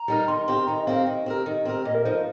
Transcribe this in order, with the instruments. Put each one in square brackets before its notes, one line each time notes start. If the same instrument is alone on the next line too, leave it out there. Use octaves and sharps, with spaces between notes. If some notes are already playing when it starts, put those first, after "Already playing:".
Already playing: [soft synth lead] A#5
[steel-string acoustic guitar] G3 D#4 A#4
[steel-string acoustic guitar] D#3 [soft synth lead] C6
[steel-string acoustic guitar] C4 G4 A#4
[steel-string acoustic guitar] D#3 [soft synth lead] A#5
[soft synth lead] D#5
[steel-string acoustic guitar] C4 G4 A#4 [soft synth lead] F5
[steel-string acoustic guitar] D#3
C4 G4 A#4
D#3
C4 G4 A#4
[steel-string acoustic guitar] A#2 [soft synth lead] D#5
[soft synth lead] A#4
[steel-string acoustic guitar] F3 D#4 [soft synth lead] C5
[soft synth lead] A#4